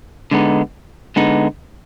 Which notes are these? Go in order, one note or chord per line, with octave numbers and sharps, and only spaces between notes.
D3 G#3 B3 D#4
D3 G#3 B3 D#4